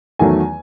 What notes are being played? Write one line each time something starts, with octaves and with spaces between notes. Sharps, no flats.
E2 D#3 F#3 A3 G#5